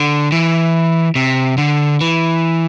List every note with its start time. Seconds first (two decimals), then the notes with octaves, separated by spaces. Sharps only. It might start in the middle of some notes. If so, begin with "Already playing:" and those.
Already playing: D3
0.32 E3
1.15 C3
1.58 D3
2.01 E3